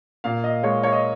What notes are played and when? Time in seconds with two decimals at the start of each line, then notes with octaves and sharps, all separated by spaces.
0.24 A#2 F5
0.44 D#5
0.63 G#3 C#5
0.83 C#5
0.92 D#5